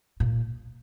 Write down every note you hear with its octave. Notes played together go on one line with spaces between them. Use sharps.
A#2